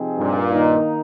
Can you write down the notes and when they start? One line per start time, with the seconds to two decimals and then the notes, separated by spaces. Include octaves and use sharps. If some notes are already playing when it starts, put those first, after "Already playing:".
Already playing: C3 F3 C4 D#4 G#4
0.18 G2 A#2
0.51 D#3 A#3 D#4